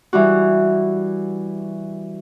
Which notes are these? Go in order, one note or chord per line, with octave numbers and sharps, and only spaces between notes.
E3 G3 F#4